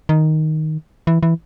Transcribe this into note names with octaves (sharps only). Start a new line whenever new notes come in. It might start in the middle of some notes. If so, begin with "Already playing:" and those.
D#3
E3
E3